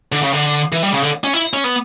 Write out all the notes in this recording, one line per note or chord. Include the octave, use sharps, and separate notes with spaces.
D3
C#3
D3
E3
G3
C#3
D3
C#4
E4
C#4
B3